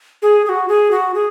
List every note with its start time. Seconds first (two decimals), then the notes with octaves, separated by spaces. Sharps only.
0.22 G#4
0.45 G#4
0.49 F#4
0.68 G#4
0.91 F#4
1.14 G#4